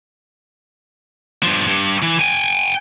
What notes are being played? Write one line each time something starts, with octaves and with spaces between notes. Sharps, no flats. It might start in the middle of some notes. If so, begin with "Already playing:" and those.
G2 F3
G2
E3
G5 G#5